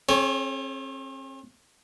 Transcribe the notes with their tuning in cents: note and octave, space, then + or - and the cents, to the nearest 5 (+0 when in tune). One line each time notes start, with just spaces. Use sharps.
C4 +45 G#4 +45 C#5 +0